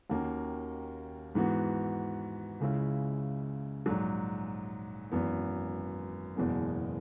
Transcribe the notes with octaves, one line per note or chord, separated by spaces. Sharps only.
D#2 D#3 A#3 C#4 F#4
G#2 E3 B3 F#4
C#2 C#3 G#3 C#4 E4
A#1 G#2 F#3
G#1 F#2 E3 B3
F#1 E2 B2 G#3 B3